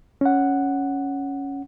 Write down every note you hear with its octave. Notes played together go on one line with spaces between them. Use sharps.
C#4 F#5